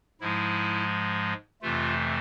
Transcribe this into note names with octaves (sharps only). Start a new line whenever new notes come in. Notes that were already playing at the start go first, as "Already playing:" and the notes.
G#2 F3 G#3 E4
F2 C3 E3 A3 F4